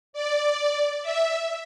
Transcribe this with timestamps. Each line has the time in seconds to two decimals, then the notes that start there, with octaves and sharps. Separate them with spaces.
0.13 D5
1.02 E5